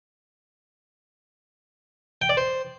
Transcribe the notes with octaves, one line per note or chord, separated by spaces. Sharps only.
G5
D5
C5